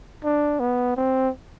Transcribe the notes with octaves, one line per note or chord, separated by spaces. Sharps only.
D4
B3
C4